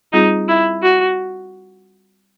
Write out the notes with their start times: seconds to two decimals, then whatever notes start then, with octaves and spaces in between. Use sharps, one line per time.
0.13 G3 C4 D#4 F4 G#4
0.48 E4
0.82 F#4